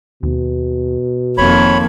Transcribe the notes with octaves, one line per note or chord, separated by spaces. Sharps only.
D#2 B2
F1 F2 D#3 A#3 C#5 B5